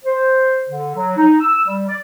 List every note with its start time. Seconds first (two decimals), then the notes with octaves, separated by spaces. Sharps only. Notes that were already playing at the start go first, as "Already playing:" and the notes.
0.05 C5
0.70 D3
0.96 F#3
1.17 D#4
1.41 E6
1.68 G3
1.88 D5